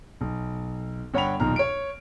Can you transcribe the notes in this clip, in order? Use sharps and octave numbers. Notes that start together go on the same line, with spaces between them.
B1
G1 C#5 F#5 G5 B5 F7
B1 E2 A#2 D#3 A#5 F6
C#5 D7